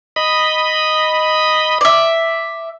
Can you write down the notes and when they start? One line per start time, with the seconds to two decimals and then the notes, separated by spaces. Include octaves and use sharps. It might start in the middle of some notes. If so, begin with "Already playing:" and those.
0.16 D#5 B5
1.81 D5 E5